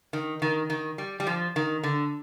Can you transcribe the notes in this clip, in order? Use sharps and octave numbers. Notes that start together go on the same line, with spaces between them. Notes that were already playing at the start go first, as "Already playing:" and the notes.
D#3
D#3
D#3
G3
G3
F3
D#3
D3